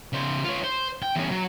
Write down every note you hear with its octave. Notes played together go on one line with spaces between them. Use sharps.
C#3 C5
F4 C#5
C5
G5
E2 C#4
F#3